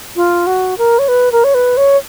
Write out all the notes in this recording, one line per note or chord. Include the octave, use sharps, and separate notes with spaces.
F4
F#4
A#4
C#5
B4
A#4
C#5
B4
C#5